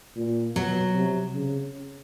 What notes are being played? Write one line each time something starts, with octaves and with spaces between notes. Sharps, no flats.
A#2
B2 F#3
C3
C#3